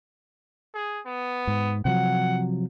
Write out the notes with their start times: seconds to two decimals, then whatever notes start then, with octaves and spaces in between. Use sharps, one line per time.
0.74 G#4
1.05 B3
1.47 G#2
1.85 C3 F3 F#3 F#5